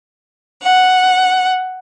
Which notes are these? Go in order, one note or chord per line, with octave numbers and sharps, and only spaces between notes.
F#5